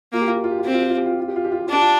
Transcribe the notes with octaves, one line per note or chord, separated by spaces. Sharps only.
A#3 F4
G4
F4
G4
F4
G4
F4
C4 G4
F4
G4
F4
G4
F4
G4
F4
G4
F4
G4
F4
G4
D4 F4
G4
F4